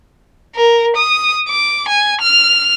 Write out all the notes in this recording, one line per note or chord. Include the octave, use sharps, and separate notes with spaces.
A#4
D#6
D6
G#5
F6